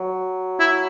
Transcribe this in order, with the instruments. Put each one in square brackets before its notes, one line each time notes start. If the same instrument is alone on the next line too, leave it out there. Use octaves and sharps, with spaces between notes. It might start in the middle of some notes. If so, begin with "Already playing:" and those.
Already playing: [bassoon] F#3
[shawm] E4